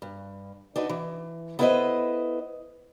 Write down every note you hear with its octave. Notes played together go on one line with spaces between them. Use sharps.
G2
D4 D#4 F#4 B4
E3
B3 E4 A4 B4 C5 D#5